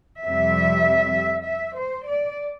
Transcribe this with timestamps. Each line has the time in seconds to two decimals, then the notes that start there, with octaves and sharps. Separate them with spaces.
0.24 F2 C3 G3 E5
1.46 E5
1.78 C5
2.07 D5